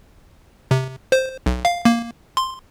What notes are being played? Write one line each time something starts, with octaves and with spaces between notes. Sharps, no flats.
C3
C5
B1
F5
A#3
C6